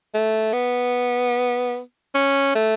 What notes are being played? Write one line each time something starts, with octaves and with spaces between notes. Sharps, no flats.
A3
B3
C#4
A3